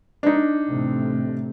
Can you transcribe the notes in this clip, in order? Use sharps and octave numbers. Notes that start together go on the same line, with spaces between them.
D4 D#4
A1 C3 A3